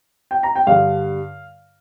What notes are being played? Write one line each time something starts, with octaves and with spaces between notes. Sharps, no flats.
G5
A#5
G5
G2 D3 F5